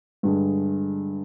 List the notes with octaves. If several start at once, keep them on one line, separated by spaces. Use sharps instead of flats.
G2 D3 G#3